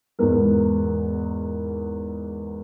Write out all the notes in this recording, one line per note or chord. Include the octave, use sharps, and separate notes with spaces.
E2 G#2 B3 A#4